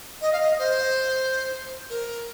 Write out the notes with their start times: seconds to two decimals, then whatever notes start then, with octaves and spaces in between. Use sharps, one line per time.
0.21 D#5
0.33 F5
0.40 D#5
0.59 C5
1.90 A#4